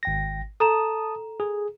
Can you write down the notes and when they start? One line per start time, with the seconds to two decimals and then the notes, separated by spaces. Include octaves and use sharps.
0.03 G#1 G5 A#6
0.60 A4 A5 A#5 D#6 E7
1.40 G#4